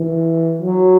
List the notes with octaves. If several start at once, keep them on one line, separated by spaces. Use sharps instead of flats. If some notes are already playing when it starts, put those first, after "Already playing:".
Already playing: E3
F#3